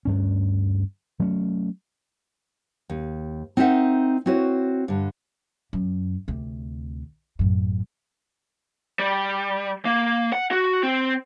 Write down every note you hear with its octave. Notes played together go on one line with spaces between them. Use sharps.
D2 G2 C#4
F#3 A3 C#4
D#2
C4 D#4 A#4 C#5 E5 F#5
C4 E4 F#4 B4 C#5
G2 D3
F#2
D2 C3
A1 F#2
G3
A#3
F#5
F#4
C4